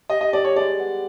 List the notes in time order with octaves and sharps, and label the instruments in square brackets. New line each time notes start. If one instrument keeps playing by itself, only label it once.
[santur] G4 [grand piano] D#5
[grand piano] D#5
[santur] G3 [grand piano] D5
[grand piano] C#5
[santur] G#3 [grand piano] D5
[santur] B3